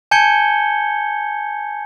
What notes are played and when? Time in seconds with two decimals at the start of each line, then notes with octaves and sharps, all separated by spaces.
0.11 G#5 A5 G6 G#6 C#7 G7